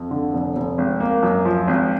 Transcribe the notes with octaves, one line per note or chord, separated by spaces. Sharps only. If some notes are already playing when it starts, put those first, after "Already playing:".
Already playing: F2
D3
F1
F1
G#1
A#3
F#2
F3
G#1